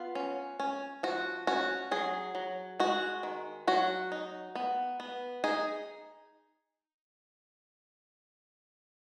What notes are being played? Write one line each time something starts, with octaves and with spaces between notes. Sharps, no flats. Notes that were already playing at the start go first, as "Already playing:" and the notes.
Already playing: B3 F4
C#4
C#4
F3 F#4
C#4 F#4
F#3 G#4
F#3
G#3 F#4
D#3
F#3 F#4
D#4
B3
B3
D#4 G#4